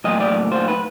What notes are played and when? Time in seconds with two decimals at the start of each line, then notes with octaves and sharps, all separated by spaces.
0.04 A2 F#3 A#3 D#5
0.20 D5
0.52 C5
0.68 B4